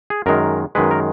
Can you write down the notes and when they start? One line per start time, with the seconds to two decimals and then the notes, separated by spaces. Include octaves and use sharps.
0.10 G#4
0.26 F#2 D#3 G#3 A#4
0.75 F#2 D#3 G#3 B4
0.91 A#4